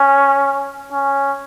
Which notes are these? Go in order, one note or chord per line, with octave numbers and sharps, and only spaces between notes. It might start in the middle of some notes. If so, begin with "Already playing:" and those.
Already playing: C#4
C#4